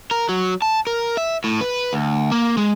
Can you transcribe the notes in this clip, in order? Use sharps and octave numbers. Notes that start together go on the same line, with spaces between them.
A#4
F#3
A5
A#4
E5
A2
B4
D2
A#3
G#3